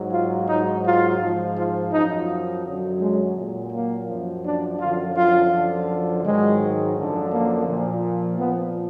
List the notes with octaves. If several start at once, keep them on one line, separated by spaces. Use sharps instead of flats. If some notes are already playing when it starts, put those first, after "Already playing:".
Already playing: G#2 F#3
F4
G#2 F#3 D#4
F4
G#2 F3
F4
F#2 F3 D#4
F#2 D3 F#3
G#3
A#2 F#3
A#3
F#2 F3
D4
F#2 D3 F3 F4
F4
F#2 D3 F3
G#2 D#3 F#3 G#3
F#2 D3 F3
A#3
A#2 F3
A#2 F3 B3